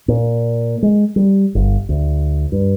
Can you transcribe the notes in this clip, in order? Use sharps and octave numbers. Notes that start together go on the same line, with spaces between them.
A#2
G#3
G3
G1
D2
G2